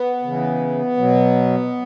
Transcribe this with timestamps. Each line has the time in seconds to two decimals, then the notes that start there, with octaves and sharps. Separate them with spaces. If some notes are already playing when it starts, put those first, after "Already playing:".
Already playing: B3
0.22 C#3 E3
0.97 B2 F#3